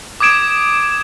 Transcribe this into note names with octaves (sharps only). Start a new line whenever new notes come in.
D6 D#6 G#6 D7 E7